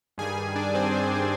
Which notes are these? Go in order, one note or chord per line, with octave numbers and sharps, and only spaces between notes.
G2 D#3 G3 G#4 G#5
D4 D5
C4 C5
G2 D#3 G3 D5
C5
D4 D5